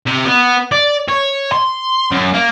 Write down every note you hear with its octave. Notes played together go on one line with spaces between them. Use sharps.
C3
B3
D5
C#5
C6
F#2
A#3